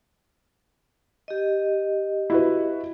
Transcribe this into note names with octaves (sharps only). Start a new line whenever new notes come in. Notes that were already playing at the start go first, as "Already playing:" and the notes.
G4 D#5
E4 F#4 B4